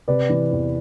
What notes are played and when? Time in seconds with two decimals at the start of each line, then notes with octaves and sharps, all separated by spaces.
0.08 C3 B4 D5
0.29 E3
0.52 E2